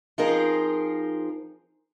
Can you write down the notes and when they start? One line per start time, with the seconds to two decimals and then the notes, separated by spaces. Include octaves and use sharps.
0.18 F3 C4 D#4 G#4 A#4 C5